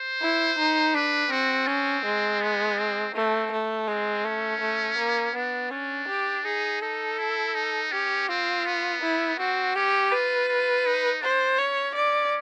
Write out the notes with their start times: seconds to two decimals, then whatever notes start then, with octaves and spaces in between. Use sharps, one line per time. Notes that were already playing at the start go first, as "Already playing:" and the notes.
Already playing: C5
0.21 E4
0.59 D#4
0.94 D4 B4
1.31 C4 F#4
1.67 C4 C#4
2.05 G#3
2.41 B3
2.78 C4
3.15 A3 C4
3.52 A3
3.88 G#3 C4
4.25 A3 C#4
4.61 A3
4.98 A#3
5.35 B3 D4
5.71 C#4 D4
6.09 G4
6.45 D#4 G#4
6.82 D#4 A4
7.18 E4
7.55 D#4
7.92 C#4 G4
8.29 C4 F4
8.66 B3
9.02 E4
9.39 C4 F#4
9.75 C#4 G4
10.12 F4 B4
10.48 F4
10.86 D#4
11.22 D4 C5
11.58 C#4 C#5
11.95 D5